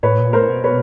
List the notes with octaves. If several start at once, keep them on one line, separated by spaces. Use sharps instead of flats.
A2 B4 C#5
A#2
A2 A#4 C5
B2
B4 C#5